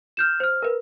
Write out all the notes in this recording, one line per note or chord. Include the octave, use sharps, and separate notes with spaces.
F6 G6 E7
C5 F6
A#4 B4